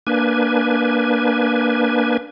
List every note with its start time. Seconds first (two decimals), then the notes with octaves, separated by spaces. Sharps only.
0.07 A#3 D4 B4 G#5